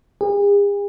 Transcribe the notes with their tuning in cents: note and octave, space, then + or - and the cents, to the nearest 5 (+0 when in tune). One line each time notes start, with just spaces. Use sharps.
G#4 -45